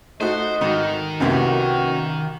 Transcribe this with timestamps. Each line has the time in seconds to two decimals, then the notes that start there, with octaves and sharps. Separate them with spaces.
0.21 A3 D#4 F#4 C5 D#5
0.61 G#2 D#3
1.20 C2 F#2 C3 A#3 B3 C#4 F#4